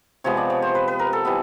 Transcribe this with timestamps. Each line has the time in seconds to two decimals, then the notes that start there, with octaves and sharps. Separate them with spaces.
0.24 C3 F3 G#3 B3 C#5
0.37 D5
0.50 C#5
0.62 C5
0.75 B4
0.88 B4
0.99 A#4
1.13 A4
1.25 E3 G3 B3